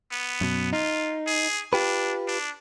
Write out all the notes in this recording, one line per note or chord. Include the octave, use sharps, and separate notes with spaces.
B3
F#2 B2
D#4 F4
G#4
D4 F4 G4 B4
D4